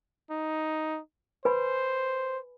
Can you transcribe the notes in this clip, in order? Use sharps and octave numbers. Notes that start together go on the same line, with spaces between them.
D#4
B4 C5 G#5 B5